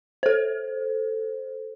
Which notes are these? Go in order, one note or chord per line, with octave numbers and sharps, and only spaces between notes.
A4 C5